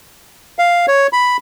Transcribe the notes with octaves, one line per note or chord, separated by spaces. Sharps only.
F5
C#5
B5